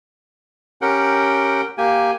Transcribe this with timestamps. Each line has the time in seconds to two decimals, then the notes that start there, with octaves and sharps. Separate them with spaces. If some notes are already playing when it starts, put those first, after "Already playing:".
0.82 C#4 G4 A#4 F#5 G5
1.78 A#3 G4 G#5